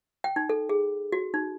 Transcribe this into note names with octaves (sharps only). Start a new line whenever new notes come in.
G5
D#4
A4
G#4
F#4
D#4